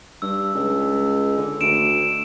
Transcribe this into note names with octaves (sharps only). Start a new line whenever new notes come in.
G2 E6
C#2
D3
D2 D7 E7